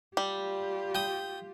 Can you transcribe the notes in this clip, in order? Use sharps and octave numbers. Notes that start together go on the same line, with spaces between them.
G3 F4 G4
G5 D#6